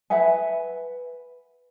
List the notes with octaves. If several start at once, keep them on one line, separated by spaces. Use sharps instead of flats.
B4 E5 F#5 G#5